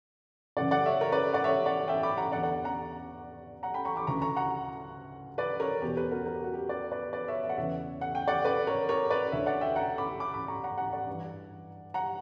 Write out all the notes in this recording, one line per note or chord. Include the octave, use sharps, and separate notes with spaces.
F#2 C#3 E3 D5 F#5
D5 F#5
C#5 E5
A#4 C#5
B4 D5
D5 F#5
C#5 E5
D5 F#5
E5 G5
B5 D6
F#5 A#5
E2 D3 D5 F#5
D5 F#5
F#5 A#5
F#5 A#5
G5 B5
A#5 C#6
B5 D6
D2 C#3 E3 A#5 C#6
A#5 C#6
F#5 A#5
B4 D5
A#4 C#5
E2 B2 G4
G4 B4
F#4 A#4
A#4
G4
F#4
G4
B4 D5
B4 D5
B4 D5
C#5 E5
E5
F#5
E2 C#3 E3 C#5 E5
F#5
G5
D5 F#5
B4 D5
A#4 C#5
A#4 C#5
B4 D5
D2 D3 C#5 E5
D5 F#5
E5 G5
F#5 A#5
B5 D6
B5 D6
B5 D6
A#5 C#6
F#5 A#5
F#5 A#5
D5 F#5
G2 E3
F#5 A#5